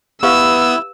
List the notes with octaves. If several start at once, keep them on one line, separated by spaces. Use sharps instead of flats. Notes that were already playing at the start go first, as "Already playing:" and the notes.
B3 E4 G4 B4 F5 E6